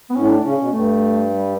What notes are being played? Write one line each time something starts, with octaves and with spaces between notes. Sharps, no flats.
B3
A2 C#4
D4
C#3 C#4
B2
G2 A3
G3